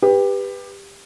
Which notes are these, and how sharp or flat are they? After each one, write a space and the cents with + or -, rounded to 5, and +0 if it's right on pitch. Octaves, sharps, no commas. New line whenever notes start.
G4 +20 B4 +0